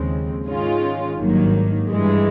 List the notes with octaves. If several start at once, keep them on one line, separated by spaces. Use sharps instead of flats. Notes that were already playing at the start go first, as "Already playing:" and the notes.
Already playing: D#2 C#3 F3 G#3 C4
G#2 D#3 G#3 C#4 F4
G#1 G2 D#3 F#3 A#3
G2 E3 G#3